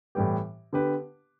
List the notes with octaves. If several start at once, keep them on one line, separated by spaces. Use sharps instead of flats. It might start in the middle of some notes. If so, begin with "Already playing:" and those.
A2 E3 G3 B3 G4
D3 B3 G4 B4